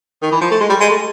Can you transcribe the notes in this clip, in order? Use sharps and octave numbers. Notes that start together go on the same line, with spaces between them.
D#3
E3
F3
A3
G#3
G3
G#3
A3